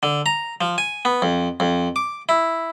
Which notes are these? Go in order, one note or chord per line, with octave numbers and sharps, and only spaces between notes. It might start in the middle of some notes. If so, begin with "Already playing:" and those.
D3
A#5
F3
G#5
B3
F2
F2
D6
E4